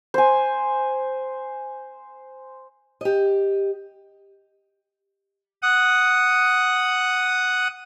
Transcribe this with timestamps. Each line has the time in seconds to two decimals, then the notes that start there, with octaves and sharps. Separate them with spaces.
0.14 C5 G#5
3.01 G4 D#5
5.62 F#5 D#6